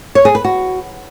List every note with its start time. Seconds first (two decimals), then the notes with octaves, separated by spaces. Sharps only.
0.15 C#5
0.25 G#4
0.35 B4
0.44 F#4